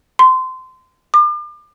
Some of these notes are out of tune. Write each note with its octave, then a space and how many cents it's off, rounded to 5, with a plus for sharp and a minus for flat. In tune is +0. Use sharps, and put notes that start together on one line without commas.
C6 -25
D6 +35